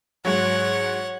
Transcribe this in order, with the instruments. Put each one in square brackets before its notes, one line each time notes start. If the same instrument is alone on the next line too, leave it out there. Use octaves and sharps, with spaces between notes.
[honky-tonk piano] G#2 F#3 [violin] C#5 F#5